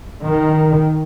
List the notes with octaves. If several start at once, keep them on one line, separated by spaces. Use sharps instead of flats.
D#3